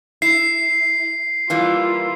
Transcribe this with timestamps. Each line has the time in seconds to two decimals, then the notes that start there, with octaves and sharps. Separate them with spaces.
0.22 E4 C7
1.50 E3 G3 A#3 E4 F4